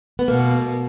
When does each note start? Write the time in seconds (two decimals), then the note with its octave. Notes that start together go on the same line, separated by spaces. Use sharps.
0.19 B3
0.28 B2 A#3